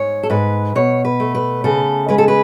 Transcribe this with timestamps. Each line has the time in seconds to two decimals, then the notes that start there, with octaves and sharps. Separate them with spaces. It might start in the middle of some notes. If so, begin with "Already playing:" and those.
Already playing: G#2 C#5
0.23 A4
0.30 G#2 B4
0.75 B2 C#5
1.05 B4
1.20 A3
1.35 B4
1.64 C#3 A4
2.09 G#3 B4
2.18 A4
2.28 B4